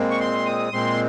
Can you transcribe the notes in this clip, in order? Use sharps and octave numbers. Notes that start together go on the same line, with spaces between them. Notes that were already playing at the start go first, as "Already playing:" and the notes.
Already playing: A#2 G#3 C4
C#6
C6
D#6
A#2 G#3 C4 C6